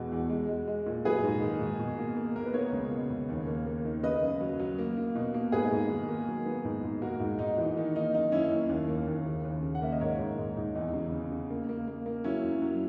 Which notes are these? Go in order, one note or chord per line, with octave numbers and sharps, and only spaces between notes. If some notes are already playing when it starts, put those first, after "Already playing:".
Already playing: E2 B2 G#3 F#4
E2
G#3
G#3
G#3
A#2
F#3 G#4 B4
G#2
D#3
G#2
B2
A#3
A#3
A#3 A#4
B4
B3 A#4 C#5
C#2
B2
C#2
D#2
A#3
A#3
D#3
C#3 B4 D#5
F#2
F#3
F#3
A#3
A#3
B2
A#3
G#2 G#4 B4
G#2
D#3
A#3
F#3
B3
G#2
G#2
A#3 F#4 A#4
G#2
G#2 D#4
E3 D#4
D#3 D#4
A#3 D#4
F#2 D#4
F#2 C#4 E4
A#3
D#2
A#3
D#2
C#3
D#2
C#3
F#5
A#3 E5
D#5
G#2 A#4 C#5
G#2
G#2
G#2
E2 D#4
C#3
C#3
C#3
A#3
A#3
A#3
A#3
F#3 C#4 E4
F#2
F#3